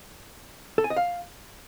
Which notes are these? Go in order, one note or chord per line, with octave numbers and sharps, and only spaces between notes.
A4
G#5
D#5
F5